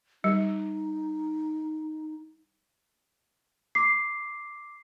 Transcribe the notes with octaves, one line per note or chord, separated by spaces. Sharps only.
G3 D#4
D6 C7